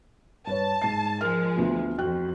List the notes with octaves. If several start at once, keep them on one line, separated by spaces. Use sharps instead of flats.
G2 B4 C#5 A5
G#2 C7
F3 G#3 A#4 F6
D2 B3 F4
F2 F#4 G5 F#6